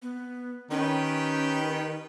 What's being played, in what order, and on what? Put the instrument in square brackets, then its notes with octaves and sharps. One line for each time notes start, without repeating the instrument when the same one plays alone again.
[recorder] B3
[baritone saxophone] D#3 [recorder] C#4 [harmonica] G4 B4 G5